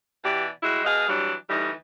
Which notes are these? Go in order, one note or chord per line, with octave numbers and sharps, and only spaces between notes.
B2 E3 G4 D5
G3 G#3 E4 F#4
B2 G#4 D#5 F5
E3 F#3 G3 D4
D2 E3 G3 D#4